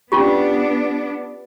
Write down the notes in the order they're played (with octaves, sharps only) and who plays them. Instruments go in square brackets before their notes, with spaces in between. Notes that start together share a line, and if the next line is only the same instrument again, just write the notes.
[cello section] B3 D4 [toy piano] C#4 F4 G4